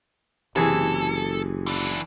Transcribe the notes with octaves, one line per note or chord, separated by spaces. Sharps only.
F#1 C3 E3 G#4 A4
E3 D4